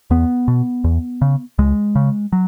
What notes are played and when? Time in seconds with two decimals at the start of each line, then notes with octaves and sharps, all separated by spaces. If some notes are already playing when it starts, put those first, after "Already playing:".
0.10 E2 B3
0.48 B2
0.84 E2
1.22 C#3
1.58 C#2 G#3
1.95 C#3
2.33 F#3